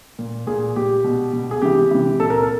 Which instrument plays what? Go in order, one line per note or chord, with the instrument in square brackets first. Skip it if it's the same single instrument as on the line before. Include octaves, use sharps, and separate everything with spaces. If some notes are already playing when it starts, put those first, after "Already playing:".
[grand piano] A#2
A#2 G#4
A#2 G4
B2
B2
G#4
C3 E3 G4
C3 E3
A#2 A4
A#4
A4